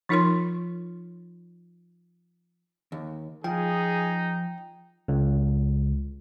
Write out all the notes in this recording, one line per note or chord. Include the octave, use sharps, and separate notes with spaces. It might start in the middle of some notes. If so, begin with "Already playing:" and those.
F3 D#4 F4 A#4 C#5 C6
D#2
F3 D#4 G#4 G5
C#2